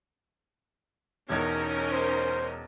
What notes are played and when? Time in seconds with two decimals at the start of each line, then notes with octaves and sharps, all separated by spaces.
1.29 E1 E2 C#4 D#4 A#4 G#6
1.92 C5